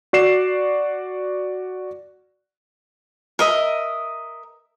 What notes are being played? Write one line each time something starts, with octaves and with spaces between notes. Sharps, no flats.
F#4 D5 C7 E7
A#4 D#5 E5